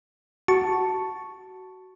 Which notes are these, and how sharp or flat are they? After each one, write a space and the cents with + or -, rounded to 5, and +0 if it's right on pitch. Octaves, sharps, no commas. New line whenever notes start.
F#4 +15 A5 +0 C#6 +0